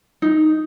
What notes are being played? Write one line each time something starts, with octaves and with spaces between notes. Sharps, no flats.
D#4